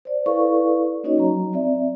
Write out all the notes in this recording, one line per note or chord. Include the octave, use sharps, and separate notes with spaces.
C5 D5
E4 A4 B4 D5 F5 C#6
A#3 C#4 D#4 F#4 C#5 D#5
F#3 A#5
C4 D5 E5